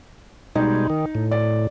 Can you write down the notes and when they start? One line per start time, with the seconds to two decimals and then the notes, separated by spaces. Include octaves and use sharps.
0.55 B2 G3 G#3 D#4
0.90 D#3
1.15 A2
1.31 D5